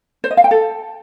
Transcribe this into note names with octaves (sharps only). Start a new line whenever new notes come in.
C5
D#5
F5
G5
A4